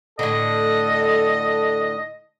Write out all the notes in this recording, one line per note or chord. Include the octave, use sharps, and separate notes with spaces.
A2 D3 A4 D#5